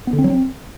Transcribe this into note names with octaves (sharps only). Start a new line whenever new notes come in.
B3
D3
C4
F#3
C4